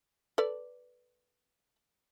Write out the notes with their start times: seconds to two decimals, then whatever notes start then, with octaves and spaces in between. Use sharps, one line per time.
0.38 A4 B4 D5